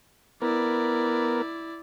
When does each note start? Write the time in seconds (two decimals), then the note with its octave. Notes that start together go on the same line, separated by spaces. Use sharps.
0.42 B3 E4 A#4 D5